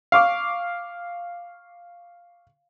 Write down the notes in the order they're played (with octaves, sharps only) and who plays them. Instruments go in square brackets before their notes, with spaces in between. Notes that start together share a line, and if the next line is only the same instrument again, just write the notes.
[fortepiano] F5 C#6 D6